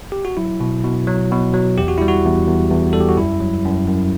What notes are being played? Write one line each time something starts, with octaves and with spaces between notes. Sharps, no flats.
G4
F#4
F#3 E4
B2
B2
F#3
B2
F#3
E2 G4
F#4
G3 E4
F#4
E2
E2
E2
G3 A4
G4
F#4
F#2 E4
F#3
F#2
F#2